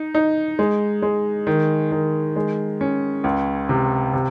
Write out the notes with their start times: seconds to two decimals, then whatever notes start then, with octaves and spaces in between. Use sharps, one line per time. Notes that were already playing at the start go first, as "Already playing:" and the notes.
Already playing: D#4
0.15 D#4
0.59 G#3
1.02 G#3
1.47 D#3
1.92 D#3
2.36 G#3
2.81 C#4
3.24 C#2
3.69 C3
4.13 C3